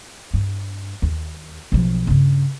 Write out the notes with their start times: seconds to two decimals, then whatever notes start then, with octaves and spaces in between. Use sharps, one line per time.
0.34 G2
1.02 D#2
1.72 B1 F3
2.07 G2 C#3